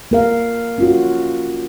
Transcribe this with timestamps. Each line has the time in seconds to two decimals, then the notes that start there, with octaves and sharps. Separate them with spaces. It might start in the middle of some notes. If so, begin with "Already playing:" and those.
0.11 A#3 A#4 F5
0.78 C#4 F4 F#4